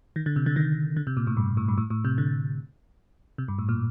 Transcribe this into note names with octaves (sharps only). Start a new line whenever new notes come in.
D#3
D3
C3
D3
D#3
D3
C3
A#2
A2
G2
A2
G2
A2
A2
C3
D3
C3
G2
A2
A#2